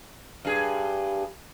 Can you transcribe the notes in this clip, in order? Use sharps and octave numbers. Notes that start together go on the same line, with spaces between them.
G2 G#4